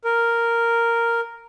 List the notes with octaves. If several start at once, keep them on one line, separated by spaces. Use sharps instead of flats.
A#4